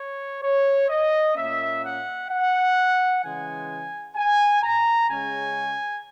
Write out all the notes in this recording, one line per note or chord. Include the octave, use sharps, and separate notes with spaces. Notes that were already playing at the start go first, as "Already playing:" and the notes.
Already playing: C#5
C#5
D#5
A#2 A#3 C#4 E5
F#5
F#5
C#3 E3 G#3 G#5
G#5
A#5
C#3 G#3 C#4 G#5